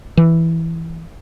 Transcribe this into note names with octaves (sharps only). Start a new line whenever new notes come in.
E3